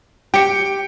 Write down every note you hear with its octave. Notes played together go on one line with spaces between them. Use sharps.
G4 G5 C#7